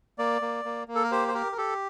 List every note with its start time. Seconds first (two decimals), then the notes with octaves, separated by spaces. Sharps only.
0.18 A#3 D5
0.42 A#3
0.65 A#3
0.88 A#3
0.95 A4
1.03 A#4
1.12 G4 C5
1.28 C5
1.34 G4 A#4
1.52 A#4
1.58 G4 A4